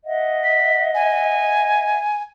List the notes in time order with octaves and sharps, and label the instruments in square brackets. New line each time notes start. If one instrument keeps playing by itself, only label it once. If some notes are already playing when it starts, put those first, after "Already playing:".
[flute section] D#5 E5 F#5
[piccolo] B6
G#5